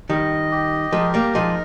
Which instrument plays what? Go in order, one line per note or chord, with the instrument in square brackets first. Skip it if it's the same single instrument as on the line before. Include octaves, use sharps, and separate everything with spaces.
[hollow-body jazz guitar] D#3 G3 [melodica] D#5
[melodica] G4
[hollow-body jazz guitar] F3 G#3 [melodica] A#4
[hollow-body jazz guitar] G3 A#3
[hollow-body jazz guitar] F3 G#3 [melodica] D#4